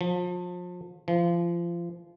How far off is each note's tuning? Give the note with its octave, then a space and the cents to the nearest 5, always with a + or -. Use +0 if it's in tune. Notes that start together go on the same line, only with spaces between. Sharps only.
F3 +35
F3 -25